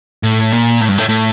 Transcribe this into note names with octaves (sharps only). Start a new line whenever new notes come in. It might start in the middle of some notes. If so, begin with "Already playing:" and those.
A2
A#2
A2
G2
A2
A2